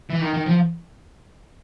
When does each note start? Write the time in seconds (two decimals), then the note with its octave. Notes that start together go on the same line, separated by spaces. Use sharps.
0.10 E3
0.21 D#3
0.34 D#3
0.46 F3